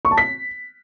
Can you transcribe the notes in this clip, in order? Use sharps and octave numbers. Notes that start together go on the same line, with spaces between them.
C#6
A5
B6